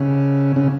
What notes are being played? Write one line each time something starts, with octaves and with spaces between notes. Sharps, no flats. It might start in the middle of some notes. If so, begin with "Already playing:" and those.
Already playing: C#3
C#3